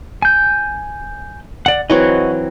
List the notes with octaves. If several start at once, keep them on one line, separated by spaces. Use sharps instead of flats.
G#5 G6
D5 F#5
E3 F#3 C4 D#5 F#5 C#6